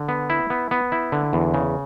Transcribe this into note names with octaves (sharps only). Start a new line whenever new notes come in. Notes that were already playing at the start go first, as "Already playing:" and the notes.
Already playing: D3
B3
E4
B3
B3
E4
D3
E2
C#3